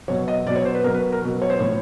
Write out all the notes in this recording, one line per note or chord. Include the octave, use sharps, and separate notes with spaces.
B2 F#3 C#5
D#5
B2 F#3 D5
C#5
C5
B4
B2 F#3 A#4
B4
A#4
B2 F#3
C#5
C5
A2 F3 C#5